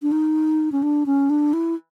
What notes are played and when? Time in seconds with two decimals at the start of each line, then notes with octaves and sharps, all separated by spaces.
0.02 D4
0.12 D#4
0.72 C#4
0.83 D4
1.06 C#4
1.30 D4
1.53 E4